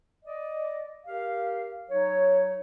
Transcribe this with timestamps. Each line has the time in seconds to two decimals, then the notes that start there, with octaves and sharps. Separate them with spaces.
0.24 D5 D#5
1.06 G4 A#4 F5
1.89 F#3 D#4 C#5